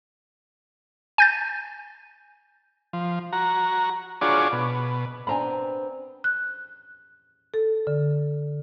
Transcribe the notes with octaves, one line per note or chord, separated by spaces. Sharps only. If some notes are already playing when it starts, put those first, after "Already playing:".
G#5 G6 A6
F3
F#4 A#5
D4 F4 F#4 G#4 C#5 D5
B2
B3 C4 D4 G#5 A#5 B5
F#6
A4
D3